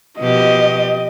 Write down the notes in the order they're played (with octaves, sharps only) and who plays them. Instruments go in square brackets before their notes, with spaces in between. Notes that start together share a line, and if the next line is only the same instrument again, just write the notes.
[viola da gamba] B2 F3 G4 [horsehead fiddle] D#5